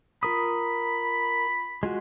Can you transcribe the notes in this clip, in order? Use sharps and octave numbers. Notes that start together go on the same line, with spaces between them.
F4 A#4 B5 D#6
G#3 F4 F#4